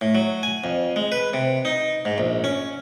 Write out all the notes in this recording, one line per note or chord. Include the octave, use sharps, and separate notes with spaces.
A2
F#3
G#5
F2
G#3
B4
C3
D#4
G#2
A#1
C#4